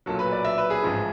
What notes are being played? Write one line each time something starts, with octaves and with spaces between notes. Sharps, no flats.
B1 A#2 F#3 A4
B4
D5
E5
B4
G#4
A1 G#2 F3